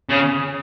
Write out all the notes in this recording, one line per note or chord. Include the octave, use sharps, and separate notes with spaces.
C#3